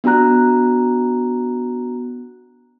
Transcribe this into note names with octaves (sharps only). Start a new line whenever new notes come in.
B3 D4 F#4 A#5 F#6